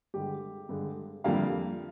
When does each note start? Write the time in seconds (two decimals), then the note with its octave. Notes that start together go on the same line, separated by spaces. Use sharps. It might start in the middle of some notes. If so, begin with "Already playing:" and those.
0.14 G2 D3 G#3 G4
0.69 G2 D3 G#3
1.24 F2 D3 G3 A#3 F5